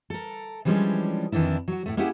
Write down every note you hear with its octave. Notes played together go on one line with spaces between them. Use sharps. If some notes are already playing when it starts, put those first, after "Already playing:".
A4 A#4
E3 F3 G3 G#3 C#4 D4
F2 D#3 E3 D4 E4
F#3 F#4
A2 A3
A#3 C#4 E4 G4 G#4 F#5